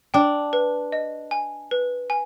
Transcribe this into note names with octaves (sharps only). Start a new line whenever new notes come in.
D4 G5
B4
D#5
G#5
B4
G#5